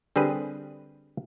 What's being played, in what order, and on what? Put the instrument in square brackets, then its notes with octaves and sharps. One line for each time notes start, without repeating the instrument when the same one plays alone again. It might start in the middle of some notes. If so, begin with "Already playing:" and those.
[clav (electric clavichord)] D3 G3 C4 G#4 B4